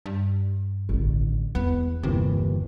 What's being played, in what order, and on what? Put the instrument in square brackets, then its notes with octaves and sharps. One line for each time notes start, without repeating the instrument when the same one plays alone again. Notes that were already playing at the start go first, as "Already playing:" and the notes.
[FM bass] G2
[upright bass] A1 D3
[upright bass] E2 [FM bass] B3
[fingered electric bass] G1 D#2 E3 [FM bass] C3